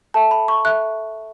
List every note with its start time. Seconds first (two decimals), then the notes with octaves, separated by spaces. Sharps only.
0.14 A4 E5 A5
0.31 B5
0.48 C#6
0.65 A4 E5 F#6